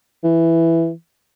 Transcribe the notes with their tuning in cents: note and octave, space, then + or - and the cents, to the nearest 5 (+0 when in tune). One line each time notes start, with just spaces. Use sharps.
E3 +5